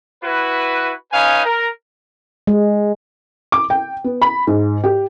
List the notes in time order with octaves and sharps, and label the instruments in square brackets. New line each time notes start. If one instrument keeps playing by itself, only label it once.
[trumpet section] E4 F#4 B4
C#4 D#4 B4 F5 G#5
A#4
[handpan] G#3
[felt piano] D6
G5
B3
B5
G#2
G4